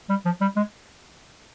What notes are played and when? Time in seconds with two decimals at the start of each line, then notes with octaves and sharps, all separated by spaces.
0.09 G3
0.25 F3
0.41 G3
0.56 G#3